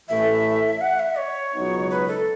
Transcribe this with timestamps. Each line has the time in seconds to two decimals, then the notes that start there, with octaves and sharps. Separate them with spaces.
0.09 A1 A2 E3 A3 E5
0.81 F#5
0.99 E5
1.18 C#5
1.54 C#2 B2 F#3 B3 D#4
1.90 B4
2.08 A4